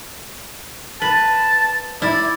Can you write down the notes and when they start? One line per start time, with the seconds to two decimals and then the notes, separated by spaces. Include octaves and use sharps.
1.02 B4 A5
2.02 E4 D5